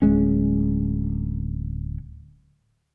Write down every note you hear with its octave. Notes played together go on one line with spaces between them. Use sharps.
D1 G#3 C#4